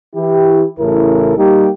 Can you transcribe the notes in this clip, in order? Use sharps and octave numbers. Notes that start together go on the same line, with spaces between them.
E3 E4 G4
A1 C#3 E4 A4 A#4
G3 A#3 D#4 G4